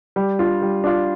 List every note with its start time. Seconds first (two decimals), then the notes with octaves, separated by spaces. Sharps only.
0.16 G3
0.39 D4 F4
0.62 G3
0.84 D4 F4